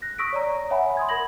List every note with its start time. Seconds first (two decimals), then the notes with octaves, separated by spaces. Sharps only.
0.02 F#6 A#6
0.18 C#6 D#6 E6 A#6 B6 D7
0.33 C#5 D5 A#5
0.70 C#5 E5 F#5 G#5 B5
0.97 C6 D#6 G#6
1.09 A#4 B5 G#6 A#6 F#7